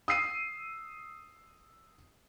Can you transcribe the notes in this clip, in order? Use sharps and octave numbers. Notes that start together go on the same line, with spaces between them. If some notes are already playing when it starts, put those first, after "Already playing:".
D#6 E6 C7 D#7